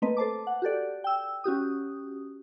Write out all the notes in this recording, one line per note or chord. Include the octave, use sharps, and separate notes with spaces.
A3 A#3 C4 B4 D#5
A4 C5 A5 D6
F#5
F#4 G4 A4 D5
G5 E6
C#4 F#4 G4 D#6